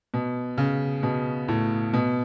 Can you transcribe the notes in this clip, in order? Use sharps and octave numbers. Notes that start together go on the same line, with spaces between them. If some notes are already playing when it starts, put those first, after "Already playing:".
B2
C#3
B2
A2
B2